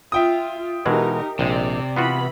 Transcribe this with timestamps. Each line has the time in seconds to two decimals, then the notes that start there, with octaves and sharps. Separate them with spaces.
0.12 F4 E5 G5 D#6
0.86 B2 E3 G#3 D#4 G4 A#4
1.39 A#1 C3 G#3 D5
1.96 E3 B3 F4 F#4 B5